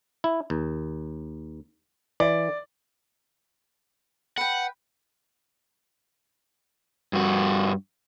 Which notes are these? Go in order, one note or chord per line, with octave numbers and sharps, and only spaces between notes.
E4
D#2
E3 D5
B4 F#5 G5
G2 F#4